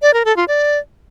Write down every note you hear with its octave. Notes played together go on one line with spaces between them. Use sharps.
D5
A#4
A4
F4
D5